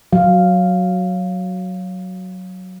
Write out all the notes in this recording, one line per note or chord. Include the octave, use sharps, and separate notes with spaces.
F#3 F5